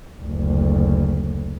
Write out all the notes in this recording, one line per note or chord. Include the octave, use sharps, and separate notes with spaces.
F#1 D2